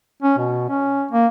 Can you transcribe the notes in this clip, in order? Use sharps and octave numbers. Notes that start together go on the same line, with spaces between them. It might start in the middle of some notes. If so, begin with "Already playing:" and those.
C#4
B2
C#4
A#3